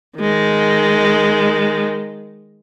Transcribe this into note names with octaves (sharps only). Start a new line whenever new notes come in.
D#3 G#3